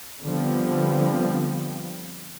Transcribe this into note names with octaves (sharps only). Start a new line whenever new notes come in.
D3 F3 G3 B3 C4